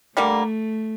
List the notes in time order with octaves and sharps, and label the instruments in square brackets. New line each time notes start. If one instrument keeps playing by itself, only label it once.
[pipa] D3 G3 A#3 [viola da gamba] A3